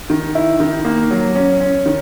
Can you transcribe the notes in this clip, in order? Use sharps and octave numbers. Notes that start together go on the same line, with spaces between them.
D#3
E4
D#3
A#3
F#3
C#4
C#4
D#3